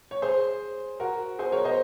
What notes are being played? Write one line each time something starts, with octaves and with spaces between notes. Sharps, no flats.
C#5
G#4 C5
F#4 A#4
G#4 C5
A#4 C#5
C5 D#5